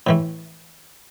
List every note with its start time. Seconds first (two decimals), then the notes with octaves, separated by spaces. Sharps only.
0.07 A2 E3 A3